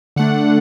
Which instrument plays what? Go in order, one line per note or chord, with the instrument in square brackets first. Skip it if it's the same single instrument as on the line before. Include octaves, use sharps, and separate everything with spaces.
[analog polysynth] D3 A3 D4 F#5